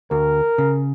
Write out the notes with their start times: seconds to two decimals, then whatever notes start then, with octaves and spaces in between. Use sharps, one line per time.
0.11 D2 A#4
0.58 C#3